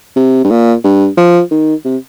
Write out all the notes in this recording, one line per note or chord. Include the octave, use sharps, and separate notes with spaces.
C3
G2
A#2
G2
F3
D#3
C3